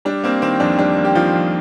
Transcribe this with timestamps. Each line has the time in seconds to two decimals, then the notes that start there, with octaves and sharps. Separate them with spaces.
0.05 G3 D4
0.24 A#3 C4
0.42 D#3 C4
0.60 F2 D4
0.78 G3 D4
0.97 A#3
1.05 G4
1.15 D#3 F3 F4
1.33 F2